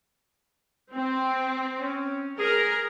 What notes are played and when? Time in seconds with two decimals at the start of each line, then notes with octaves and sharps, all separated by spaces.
0.94 C4
1.80 C#4
2.39 G#4 A#4